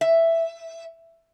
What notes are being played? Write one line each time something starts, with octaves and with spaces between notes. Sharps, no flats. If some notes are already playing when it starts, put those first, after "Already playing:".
E5